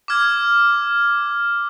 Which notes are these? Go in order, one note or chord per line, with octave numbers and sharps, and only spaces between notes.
D6 F6 G#6